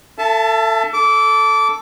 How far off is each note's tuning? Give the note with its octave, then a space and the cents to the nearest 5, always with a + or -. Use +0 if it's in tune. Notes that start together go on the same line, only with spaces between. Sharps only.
A4 +25 E5 +30 A5 -15
A4 +0 D6 -20